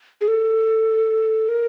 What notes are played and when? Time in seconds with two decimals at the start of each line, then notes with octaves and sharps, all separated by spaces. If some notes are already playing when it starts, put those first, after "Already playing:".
0.21 G#4
0.28 A4
1.49 A#4